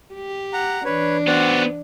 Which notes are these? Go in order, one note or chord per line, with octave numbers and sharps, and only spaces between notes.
G4
F#5 A#5
E3 D4 B4 C#5
B3 F#4 C5 D5 F#5